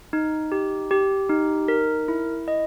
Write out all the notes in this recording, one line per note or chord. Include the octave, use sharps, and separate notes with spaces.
D#4
G4
G4
D#4
A#4
E4
D#5